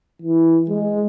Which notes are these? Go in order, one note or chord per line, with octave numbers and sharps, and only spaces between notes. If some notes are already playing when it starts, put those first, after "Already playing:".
E3
G#3